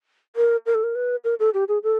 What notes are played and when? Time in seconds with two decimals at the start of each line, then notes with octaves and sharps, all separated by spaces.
0.36 A#4
0.66 A#4
0.75 A4
0.83 A#4
0.95 B4
1.24 A#4
1.39 A4
1.54 G4
1.68 G#4
1.83 A4